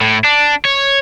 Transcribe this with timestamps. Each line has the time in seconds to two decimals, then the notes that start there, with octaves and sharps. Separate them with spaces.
0.01 A2
0.25 D4
0.65 C#5